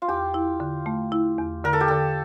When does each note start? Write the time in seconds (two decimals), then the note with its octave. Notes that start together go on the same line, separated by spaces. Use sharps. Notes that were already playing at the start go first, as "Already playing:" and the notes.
0.02 F4
0.08 E2 G4
0.34 E4
0.60 D3
0.86 A3
1.12 E4
1.38 E2
1.64 D3 A#4
1.73 A4
1.80 G4
1.88 D3 A4